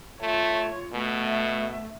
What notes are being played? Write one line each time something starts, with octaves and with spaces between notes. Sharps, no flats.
A3 F4 C#5
B2 A3 E5